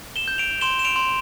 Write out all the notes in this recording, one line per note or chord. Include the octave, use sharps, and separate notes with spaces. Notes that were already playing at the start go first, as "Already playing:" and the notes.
E7 G7
G6
D7 F7
C6 E7 G7
E7
D7 F7
C6